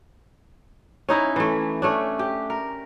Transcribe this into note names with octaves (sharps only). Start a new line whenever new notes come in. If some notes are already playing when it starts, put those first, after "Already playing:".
C#4 D#4 E4
E3 A3
A3 C#4 D4
G4
A#4